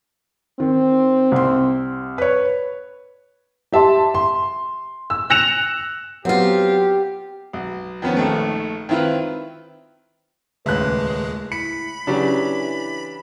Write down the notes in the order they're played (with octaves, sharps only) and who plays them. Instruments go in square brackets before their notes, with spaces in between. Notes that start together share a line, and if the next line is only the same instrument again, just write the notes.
[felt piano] D#3 [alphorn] C4
[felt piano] C2 C6
B4 C#5
[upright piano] G4 E5 A5 C6
C6
E6
E6 F#6 A#6 C#7 E7 F7
[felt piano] F#3 B3 [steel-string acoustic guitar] C4 F4 [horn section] G4
[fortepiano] B1
D#3 F3 B3 C#4
A#1 D#3 A3
D#3 C4 E4 F4 B4
[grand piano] D#1 F#6 [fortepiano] C#2 A2 E5 [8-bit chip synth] G#3 [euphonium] B4
[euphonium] E4 [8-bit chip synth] B5 [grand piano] C#7
[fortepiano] C#3 F#3 C#4 [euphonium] E3 [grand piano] D4 G4